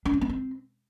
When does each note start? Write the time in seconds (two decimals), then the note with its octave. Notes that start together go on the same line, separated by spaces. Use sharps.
0.05 D4
0.13 C#4
0.21 B3
0.29 C4